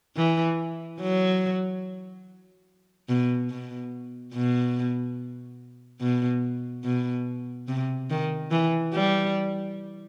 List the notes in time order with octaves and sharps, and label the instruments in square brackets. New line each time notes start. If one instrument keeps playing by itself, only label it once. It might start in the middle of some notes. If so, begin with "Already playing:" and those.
[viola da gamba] E3
F#3
B2
B2
B2
B2
B2
C3
D#3
E3
G3